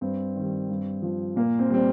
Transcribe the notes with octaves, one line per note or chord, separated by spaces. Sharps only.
G2 C4
D#3 G3
G2
F3
A#2 A#3
C4
G3 C4